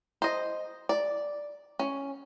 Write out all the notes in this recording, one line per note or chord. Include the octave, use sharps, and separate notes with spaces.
C5 D#5
D5
C#4